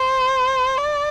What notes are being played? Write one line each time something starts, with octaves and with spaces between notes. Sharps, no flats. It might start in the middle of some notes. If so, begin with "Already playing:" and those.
Already playing: C5
D5